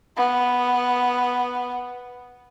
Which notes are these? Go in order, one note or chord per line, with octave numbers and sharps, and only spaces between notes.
B3